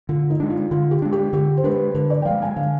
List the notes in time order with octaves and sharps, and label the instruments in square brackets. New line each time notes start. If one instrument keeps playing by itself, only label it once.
[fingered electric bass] D3 [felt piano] F4
[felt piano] D#4
[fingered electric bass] G#3 D4
[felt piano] F4
[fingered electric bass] D3 [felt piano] F4
[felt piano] G4
[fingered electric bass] G#3 D4
[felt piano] G4
[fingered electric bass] D3 [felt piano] G4
[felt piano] C5
[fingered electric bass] G#3 D4 [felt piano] B4
[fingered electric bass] D3 [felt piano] B4
[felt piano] D5
G5
[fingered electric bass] F3 G#3 [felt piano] F5
[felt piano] G#5
[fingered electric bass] D3 [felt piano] F5